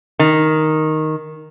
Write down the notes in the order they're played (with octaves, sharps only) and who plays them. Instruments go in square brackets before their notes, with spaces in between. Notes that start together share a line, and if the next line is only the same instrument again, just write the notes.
[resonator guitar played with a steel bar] D#3